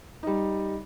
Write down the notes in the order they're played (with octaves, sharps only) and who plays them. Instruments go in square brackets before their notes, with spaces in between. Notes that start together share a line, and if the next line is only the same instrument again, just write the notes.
[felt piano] G3 D#4